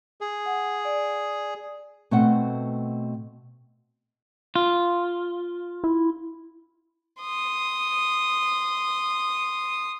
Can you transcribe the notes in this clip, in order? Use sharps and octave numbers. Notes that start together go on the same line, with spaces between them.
G#4
F#5
D5
B2 A3 B3 C4 F#5
F4
E4
C6 D#6